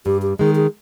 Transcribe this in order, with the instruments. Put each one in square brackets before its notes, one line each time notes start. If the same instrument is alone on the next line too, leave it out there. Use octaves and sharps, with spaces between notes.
[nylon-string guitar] G2 [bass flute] G4
[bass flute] G4
[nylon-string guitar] D#3 G#3 [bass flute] G#4
[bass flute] G#4